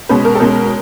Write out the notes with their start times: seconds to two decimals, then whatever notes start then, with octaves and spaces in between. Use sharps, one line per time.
0.09 B2 G#3 C#4 B4
0.25 A#4
0.35 A4
0.40 B2 G#3 C#4 A#4